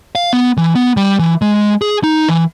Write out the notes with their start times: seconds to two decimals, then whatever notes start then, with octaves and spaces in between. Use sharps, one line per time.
0.15 F5
0.33 B3
0.57 E3
0.75 B3
0.97 G3
1.19 E3
1.42 G#3
1.82 G#4
2.04 D#4
2.28 E3